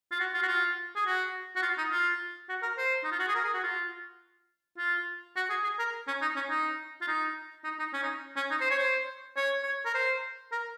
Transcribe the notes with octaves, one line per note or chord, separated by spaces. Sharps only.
F4
F#4
F4
F#4
F4
G#4
F#4
F#4
F4
D#4
F4
F#4
A#4
C5
D#4
F4
F#4
G#4
A#4
G#4
F#4
F4
F4
F#4
G#4
G#4
A#4
C#4
D#4
C#4
D#4
F4
D#4
D#4
D#4
C#4
D#4
C#4
D#4
C5
C#5
C5
C#5
C#5
A#4
C5
A#4